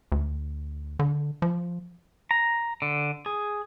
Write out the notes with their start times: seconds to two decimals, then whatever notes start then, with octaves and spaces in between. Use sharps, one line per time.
0.12 D2
0.99 D3
1.42 F3
2.31 A#5
2.82 D3
3.26 G#4